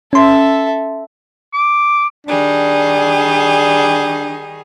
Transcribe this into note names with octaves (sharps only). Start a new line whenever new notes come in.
C#4 A4 E5 C6
D6
D#3 G3 D4 G#4